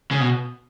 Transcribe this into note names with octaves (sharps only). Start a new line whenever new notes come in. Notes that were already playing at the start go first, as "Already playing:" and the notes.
C#3
B2